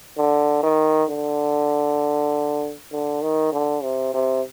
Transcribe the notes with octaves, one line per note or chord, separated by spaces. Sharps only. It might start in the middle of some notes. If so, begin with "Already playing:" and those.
D3
D#3
D3
D3
D#3
D3
C3
C3